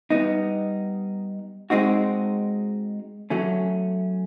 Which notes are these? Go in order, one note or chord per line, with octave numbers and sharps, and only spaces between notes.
G3 B3 D#4
G#3 C4 D#4 F#4
F#3 A3 C#4